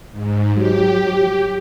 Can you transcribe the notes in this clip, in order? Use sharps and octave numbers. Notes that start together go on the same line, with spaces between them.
G#2
F#3 G4